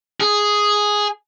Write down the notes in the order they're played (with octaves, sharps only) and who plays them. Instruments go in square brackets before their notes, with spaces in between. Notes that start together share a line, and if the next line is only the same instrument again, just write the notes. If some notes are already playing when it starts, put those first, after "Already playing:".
[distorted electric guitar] G#4